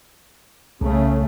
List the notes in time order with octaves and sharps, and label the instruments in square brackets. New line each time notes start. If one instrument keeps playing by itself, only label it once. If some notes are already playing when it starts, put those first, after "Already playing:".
[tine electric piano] C2 [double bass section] C#3 A3